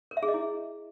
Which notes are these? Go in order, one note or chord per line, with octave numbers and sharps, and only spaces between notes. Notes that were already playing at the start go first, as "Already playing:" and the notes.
A#4
E5
G#4
D#5
E4